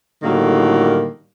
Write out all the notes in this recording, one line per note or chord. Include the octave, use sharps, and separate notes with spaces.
A2 D3 D#3 F#3 G3 A#3